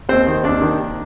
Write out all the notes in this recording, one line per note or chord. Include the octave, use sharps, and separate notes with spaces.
D#2 C4 C5
D#3
D#2 D4 D5
D#3